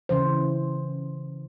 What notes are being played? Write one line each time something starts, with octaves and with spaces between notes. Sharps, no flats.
C#3 E3 C5